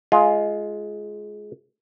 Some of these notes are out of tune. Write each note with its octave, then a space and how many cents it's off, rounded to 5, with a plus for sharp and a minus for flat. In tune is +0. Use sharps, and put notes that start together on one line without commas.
G#3 +15 F4 +0